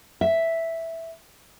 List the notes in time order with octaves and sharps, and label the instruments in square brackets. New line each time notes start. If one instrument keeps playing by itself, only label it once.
[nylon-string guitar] E5